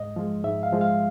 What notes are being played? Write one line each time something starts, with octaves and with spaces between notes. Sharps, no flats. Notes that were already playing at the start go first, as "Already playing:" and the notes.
Already playing: G#2 D#5
F3 G#3
G#2 E5
F5
F3 G#3
F5